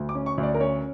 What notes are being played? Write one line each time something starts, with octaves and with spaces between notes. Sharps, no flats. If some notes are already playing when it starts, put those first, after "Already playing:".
Already playing: D2
D6
C#4
C#6
D2
D5
A#4
C#4 C#5